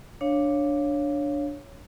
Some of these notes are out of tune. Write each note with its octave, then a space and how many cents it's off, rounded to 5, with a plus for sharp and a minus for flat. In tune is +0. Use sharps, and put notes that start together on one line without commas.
D4 +0 C#5 +0 F5 +0